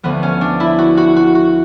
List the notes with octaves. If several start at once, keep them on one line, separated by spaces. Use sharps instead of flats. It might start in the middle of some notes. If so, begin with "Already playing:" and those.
D2 D3 F3 B3
C#4
D4
E4
F#4
F#4
F#4
F#4